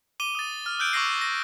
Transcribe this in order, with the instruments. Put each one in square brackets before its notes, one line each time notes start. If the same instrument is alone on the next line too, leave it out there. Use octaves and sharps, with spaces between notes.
[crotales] D6 D#7 G7
D#6 A6
F6
E6 F#6 G6 D7
C#6 D6 E6 A#6 C7
A#6